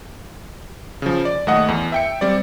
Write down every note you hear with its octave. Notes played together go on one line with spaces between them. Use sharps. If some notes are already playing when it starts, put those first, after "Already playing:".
C#3 F3
D5
D#2 A3 D#5 F#5 D#6
E2
E5 G5 C#7
G3 C4 D5